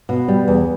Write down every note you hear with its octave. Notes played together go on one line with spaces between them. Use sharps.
B2
G3
E2